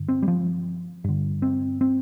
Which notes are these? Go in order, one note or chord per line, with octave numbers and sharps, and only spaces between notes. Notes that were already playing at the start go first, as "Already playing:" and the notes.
Already playing: G2 D3
C4
G3
F3
G2 D3
C4
C4